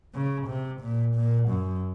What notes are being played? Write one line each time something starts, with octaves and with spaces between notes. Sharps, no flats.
C#3
C3
A#2
A#2
F#2